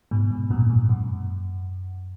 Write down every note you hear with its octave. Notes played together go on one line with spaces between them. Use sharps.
G#2 B2
G#2
F#2 A#2
G#2
F#2